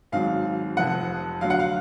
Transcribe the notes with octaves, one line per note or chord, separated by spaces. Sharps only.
G#1 G#2 F#3 F5
F1 F2 F3 F#5
D2 D3 F#3 F5
F#5
F5